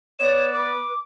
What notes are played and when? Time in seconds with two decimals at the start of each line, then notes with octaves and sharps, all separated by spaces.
0.19 B3 C#5 D5 E7
0.53 B4 D6